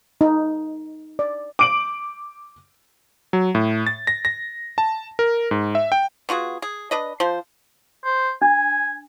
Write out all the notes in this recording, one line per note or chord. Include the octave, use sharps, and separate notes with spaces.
D#4
D5
D6 D7 F#7
F#3
A2
A6
A#6
A#6
A5
A#4
G#2
E5
G5
B3 F4 F#4 G#4
G#4
D4 B4 D#5
F3 C5
C5
D4 G#5